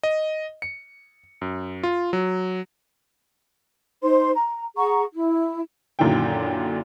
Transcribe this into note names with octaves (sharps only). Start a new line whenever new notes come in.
D#5
C#7
F#2
F4
F#3
D#4 C5 C6
A#5
G#4 F#5 A#5 C#6
E4
F#2 A#2 D3 D#3 E4 G5